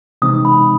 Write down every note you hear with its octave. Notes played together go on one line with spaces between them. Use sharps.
C3 E3 G#3 C4 D#4 D#6
B5